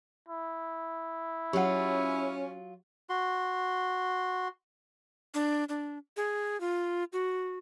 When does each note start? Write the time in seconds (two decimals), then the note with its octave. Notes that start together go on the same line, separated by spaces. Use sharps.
0.29 E4
1.53 F#3 C#4 F4 G4 F#5
3.09 F#4 C6
5.34 D4
5.69 D4
6.17 G#4
6.61 F4
7.13 F#4